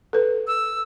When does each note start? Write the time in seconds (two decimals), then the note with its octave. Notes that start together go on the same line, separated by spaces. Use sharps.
0.13 A4 B4
0.47 E6